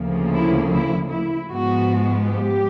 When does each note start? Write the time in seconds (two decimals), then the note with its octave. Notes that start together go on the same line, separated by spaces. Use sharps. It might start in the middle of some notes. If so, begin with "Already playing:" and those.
Already playing: D2 C#3 F3 A#3
0.32 E4
0.71 E4
1.10 E4
1.49 G#2 F3 G#3 B3 F#4
2.28 G4